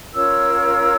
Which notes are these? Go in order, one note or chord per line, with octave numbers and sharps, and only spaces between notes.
C#4 F4 A#4 C#5 E6